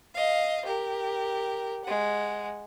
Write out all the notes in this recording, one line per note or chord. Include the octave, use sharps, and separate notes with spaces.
D#5 F5
G4 A#4
G#3 F#5